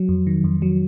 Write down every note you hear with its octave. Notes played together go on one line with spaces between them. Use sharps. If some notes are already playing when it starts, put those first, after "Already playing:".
Already playing: F#3
F2
D#3
F2
F#3